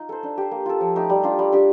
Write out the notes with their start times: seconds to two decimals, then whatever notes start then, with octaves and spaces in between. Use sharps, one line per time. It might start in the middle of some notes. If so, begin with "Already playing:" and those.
Already playing: D#4 F4
0.09 A4 C5
0.23 D4
0.38 G4 C5
0.51 A#3
0.66 F4 A4
0.81 F3
0.96 A3 D#4 G4
1.10 G3
1.23 D4 F4
1.39 G3
1.52 D4 G4